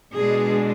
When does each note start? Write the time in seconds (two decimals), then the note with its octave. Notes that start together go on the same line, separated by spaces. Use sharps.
0.13 B2 G#3 D4 G#4